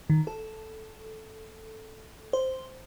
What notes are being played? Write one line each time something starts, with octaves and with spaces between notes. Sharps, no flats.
D#3
A4
C5